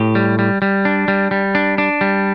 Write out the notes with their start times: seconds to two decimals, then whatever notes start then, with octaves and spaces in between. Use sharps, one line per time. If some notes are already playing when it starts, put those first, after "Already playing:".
Already playing: A2 G4
0.15 G3
0.39 G3
0.62 G3
0.85 D4
1.08 G3
1.31 G3
1.55 D4
1.78 D4
2.01 G3